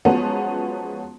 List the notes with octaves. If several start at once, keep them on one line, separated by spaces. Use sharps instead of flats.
F3 F#3 G#3 B3 C#4